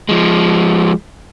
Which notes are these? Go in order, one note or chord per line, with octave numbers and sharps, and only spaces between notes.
F3 G#3